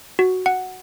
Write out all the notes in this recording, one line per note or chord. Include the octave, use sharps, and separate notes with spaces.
F#4
F#5